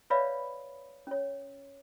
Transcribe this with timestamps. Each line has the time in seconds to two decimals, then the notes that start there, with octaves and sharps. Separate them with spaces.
0.10 B4 C#5 D5 E5 F5 B5
1.07 C#4 C#5